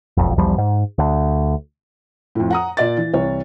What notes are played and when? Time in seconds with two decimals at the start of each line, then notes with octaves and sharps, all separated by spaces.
0.17 E1 B1 F2
0.38 B1 E2 F3 G3
0.58 G#2
0.98 D2
2.35 F2 A2
2.50 F#5 A#5 D#6
2.77 A#2 D5 A6
2.97 E3
3.13 C2 E3 C#5